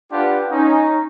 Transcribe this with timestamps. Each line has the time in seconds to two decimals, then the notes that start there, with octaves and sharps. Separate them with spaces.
0.12 D4 F4 G4 B4 F#5
0.52 C#4 D#4